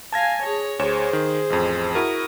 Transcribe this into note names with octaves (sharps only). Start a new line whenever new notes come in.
F5 G#5 A5 G#6 A#6
G#4 C#5
D2 G#4 C5 C#5 E7
D#3
A1 F2
E4 F#4 A#4 D#6